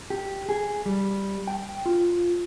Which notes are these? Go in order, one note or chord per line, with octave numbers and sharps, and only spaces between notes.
G4
G#4
G3
G5
F4